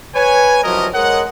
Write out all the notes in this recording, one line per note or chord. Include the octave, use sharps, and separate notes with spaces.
B4 C#5 G#5
C2 F3 F#3 C#4 A#4 D#5
G#3 A#4 C#5 D#5 F#5